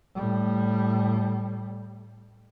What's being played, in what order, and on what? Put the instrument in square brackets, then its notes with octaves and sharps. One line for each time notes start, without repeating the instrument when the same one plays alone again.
[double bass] A2 G3